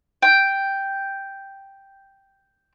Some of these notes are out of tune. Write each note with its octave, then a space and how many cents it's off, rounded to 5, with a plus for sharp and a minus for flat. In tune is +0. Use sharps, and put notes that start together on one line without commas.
G5 +0